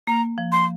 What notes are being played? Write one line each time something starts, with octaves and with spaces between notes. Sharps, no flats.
A#3 A#5
F3
C6